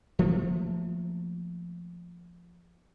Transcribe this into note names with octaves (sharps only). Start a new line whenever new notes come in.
F3 A3 A#3